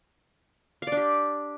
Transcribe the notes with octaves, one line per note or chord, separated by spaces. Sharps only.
D4 G4 D5 F5